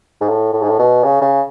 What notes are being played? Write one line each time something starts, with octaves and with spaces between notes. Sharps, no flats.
G#2
A2
A2
G#2
A2
B2
C#3
C#3